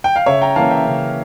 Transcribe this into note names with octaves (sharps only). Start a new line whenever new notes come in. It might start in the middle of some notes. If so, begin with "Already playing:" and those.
G5
F5
C#3 C#5 E5
G5 A#5
E3 A#3 C#4 F5 A5
E5 G5
C#3